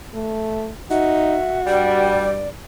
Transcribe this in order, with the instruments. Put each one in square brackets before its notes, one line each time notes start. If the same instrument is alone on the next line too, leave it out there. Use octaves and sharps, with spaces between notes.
[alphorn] A3
[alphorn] D#4 [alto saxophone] F#4 [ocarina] E5
[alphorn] G2 [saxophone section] G3 [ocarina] D5